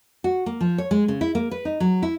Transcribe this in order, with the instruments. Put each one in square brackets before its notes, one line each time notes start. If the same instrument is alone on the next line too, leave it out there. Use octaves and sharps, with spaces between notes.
[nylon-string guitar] F#4
A#3
F3
C#5
G#3
C#3
E4
A#3
B4
D#4
F#3
E4